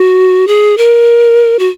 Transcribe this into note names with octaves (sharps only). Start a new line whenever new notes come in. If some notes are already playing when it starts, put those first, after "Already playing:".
Already playing: F#4
G#4
A#4
F#4